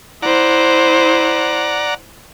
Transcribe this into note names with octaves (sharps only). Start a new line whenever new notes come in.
E4 C5 D5 F#5 A#5